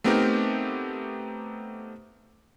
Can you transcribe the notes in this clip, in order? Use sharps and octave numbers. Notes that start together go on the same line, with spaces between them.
A3 B3 C4 D#4 G4 A#4